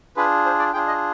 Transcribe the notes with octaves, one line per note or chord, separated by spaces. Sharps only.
D4 F4 G#4 B4
C5
D5
D4 F4 G#4 G5
D#5